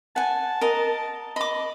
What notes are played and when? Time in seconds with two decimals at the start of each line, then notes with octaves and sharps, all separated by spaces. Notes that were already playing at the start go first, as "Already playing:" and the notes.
0.16 F#5 G#5 A5
0.61 A#4 D#5
1.36 D#5 B5 D6